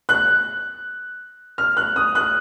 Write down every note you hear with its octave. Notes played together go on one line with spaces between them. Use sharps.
F#6
F6
F#6
D#6
F#6